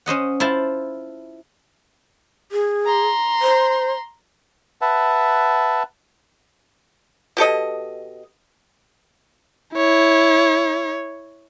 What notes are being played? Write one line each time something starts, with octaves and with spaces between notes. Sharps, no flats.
C#4 C5 D#5 F#5
E4 F4 C5 A5
G#4
A#5 C6
C5
B4 E5 F#5 A5
B2 G4 A4 D#5
E4 C#5